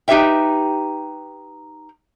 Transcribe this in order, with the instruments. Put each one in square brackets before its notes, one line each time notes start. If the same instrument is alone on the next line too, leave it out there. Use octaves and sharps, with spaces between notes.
[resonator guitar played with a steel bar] D#4 G4 B4 E5 G5